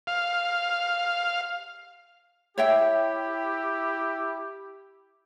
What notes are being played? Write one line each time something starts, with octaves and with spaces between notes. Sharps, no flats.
F5
E4 G4 C#5 E5 G5